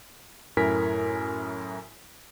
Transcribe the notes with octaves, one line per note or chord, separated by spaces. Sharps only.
F#2 A2 E4 A#4 G#5 B6